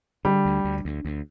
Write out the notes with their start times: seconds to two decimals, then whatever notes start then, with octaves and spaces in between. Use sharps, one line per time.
0.25 D3 G3
0.45 D2
0.65 D2
0.85 D2
1.05 D2